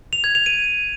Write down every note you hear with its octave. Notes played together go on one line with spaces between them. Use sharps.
F7
G#6
F7
D#7